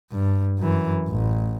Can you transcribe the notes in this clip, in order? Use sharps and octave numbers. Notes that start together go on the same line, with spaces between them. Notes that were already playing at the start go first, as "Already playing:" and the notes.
G2
F#2 E3
A1